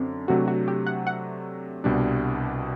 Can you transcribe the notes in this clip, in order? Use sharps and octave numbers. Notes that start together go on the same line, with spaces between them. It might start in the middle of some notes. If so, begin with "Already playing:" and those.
Already playing: F#2 D3 C4
C3 F#3 A3 D4 F#4
F#4
G4
F#5
F#5
C2 B2 G3 D4